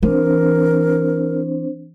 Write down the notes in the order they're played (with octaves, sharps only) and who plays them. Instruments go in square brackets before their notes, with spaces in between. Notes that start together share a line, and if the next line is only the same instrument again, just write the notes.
[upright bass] E3 [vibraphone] C4 D4 C5 [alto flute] A#4